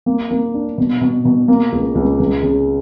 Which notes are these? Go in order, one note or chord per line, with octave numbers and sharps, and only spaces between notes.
A#3
A#3
D4
B2
B2
B2
A#3
C#2
C#2
C#2
C#3